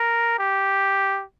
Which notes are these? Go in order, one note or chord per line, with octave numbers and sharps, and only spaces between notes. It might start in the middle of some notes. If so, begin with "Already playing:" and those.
Already playing: A#4
G4